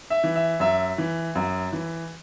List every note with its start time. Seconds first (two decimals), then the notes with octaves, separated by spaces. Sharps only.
0.10 E5
0.24 E3
0.36 E5
0.60 F#2 E5
0.98 E3
1.35 F#2
1.73 E3